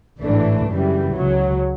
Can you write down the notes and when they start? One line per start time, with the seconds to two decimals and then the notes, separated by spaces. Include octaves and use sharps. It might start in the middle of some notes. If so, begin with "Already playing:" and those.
0.20 A1 G#2 E3 A3 D4
0.69 F#2 C#3 E3 G3
1.16 C#2 C#3 F#3